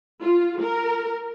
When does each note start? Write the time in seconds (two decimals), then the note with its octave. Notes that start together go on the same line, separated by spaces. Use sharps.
0.22 F4
0.61 A#4